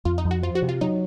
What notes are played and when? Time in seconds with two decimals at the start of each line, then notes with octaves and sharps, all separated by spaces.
0.05 F2 F4
0.18 D#4
0.25 F2
0.31 F#4
0.43 F3 F4
0.55 F#4
0.62 C3
0.69 F4
0.81 F#3 D#4